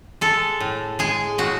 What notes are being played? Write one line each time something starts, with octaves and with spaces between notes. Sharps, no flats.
G#3 A4
A2
G#3 G#4
A2 F#4